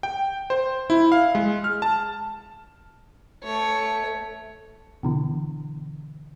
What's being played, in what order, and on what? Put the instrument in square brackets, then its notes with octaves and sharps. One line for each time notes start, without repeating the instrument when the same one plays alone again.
[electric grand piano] G5
C5
E4
F5
G#3
F6
A5
[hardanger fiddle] A3 C#5
[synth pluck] B2 D3 E3